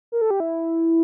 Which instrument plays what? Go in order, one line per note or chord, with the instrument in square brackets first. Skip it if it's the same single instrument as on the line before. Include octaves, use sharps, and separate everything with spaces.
[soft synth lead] A#4
A4
G4
E4